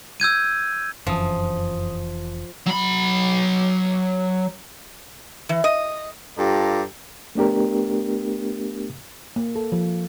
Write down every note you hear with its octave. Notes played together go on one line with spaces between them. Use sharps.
E6 G6 G#6 D#7
F1 F#2 E3 F3 D#6
F#3 B5
E3
D#5
G2 F4 G4 A4 D5 A#5
A3 B3 D4 G4 A#4
A#3
A4
F3